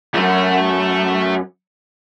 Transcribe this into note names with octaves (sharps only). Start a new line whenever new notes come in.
C#2 F#2 A3